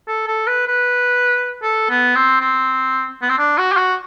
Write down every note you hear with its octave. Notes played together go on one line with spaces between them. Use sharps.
A4
A4
B4
B4
A4
B3
C4
C4
B3
C4
D4
F#4
G4
F#4